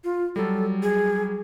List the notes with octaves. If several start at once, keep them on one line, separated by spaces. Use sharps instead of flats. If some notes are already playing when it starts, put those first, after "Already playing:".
F4
F#3 G3 A4
G#4